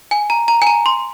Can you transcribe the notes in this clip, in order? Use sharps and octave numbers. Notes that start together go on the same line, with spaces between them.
G#5
A#5
A#5
G#5
A#5
C6